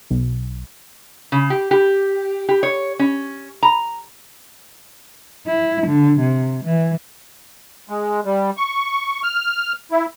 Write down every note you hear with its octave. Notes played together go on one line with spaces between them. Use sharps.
B1
C#3
G4
G4
G4
C#5
C#4
A#5
E4
D3
C3
E3
G#3
G3
C#6
F6
E4